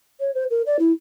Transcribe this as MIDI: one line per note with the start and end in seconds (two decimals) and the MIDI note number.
0.20 0.31 73
0.34 0.44 72
0.50 0.62 70
0.66 0.77 74
0.79 0.92 64